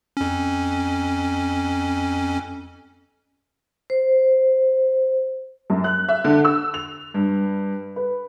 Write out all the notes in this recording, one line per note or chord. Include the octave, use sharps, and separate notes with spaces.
F2 C#4
C5
F#2
F#6
E5
D3
E6
F7
G2
B4